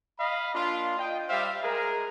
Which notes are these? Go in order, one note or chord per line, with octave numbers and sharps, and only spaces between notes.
D#5 F5 B5
A#3 D4 F4
D#5 G5
G3 C5 E5 F5
G#3 G#4 A#4